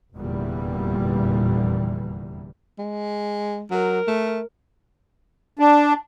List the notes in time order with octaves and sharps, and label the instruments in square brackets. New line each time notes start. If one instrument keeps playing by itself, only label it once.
[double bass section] F1 E2 A#2 D3 E3 G3
[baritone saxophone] G#3
[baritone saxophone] F#3 [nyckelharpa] A#4
[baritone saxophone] A3
[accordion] D4